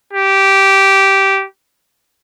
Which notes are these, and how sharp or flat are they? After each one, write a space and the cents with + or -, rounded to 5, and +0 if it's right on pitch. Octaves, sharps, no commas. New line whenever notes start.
G4 -10